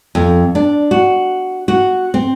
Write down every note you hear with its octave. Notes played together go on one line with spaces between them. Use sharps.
F2
D4
F#4
F#4
C4